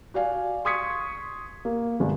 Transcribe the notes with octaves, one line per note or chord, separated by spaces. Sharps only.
F#4 D5 F5 G#5
C6 C#6 D#6 G#6 B6 C#7
A#3
G1 G#3 D4